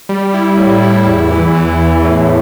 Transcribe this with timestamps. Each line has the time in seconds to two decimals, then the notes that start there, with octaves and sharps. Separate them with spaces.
0.09 G3
0.34 E4
0.58 A2
0.82 E4
1.06 E2
1.31 E3
1.55 E3
1.79 E2
2.05 A2